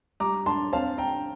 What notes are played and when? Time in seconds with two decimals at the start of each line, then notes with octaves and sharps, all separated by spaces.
0.20 G3 A#5 D6
0.46 D4 A5 C6
0.73 C4 F5 A5
0.98 D3 G5 A#5